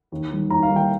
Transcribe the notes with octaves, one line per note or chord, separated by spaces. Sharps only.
D#2
D#3 G3
D#2 A#5
F5
D#3 G3
G5